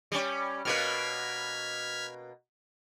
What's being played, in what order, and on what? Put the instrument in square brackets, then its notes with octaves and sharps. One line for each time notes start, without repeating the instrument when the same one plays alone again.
[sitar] G3 C#4
[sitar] B2 A#3 B4 [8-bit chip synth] F6 G#6 B6